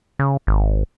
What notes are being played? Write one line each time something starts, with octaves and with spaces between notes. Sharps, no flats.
C#3
G#1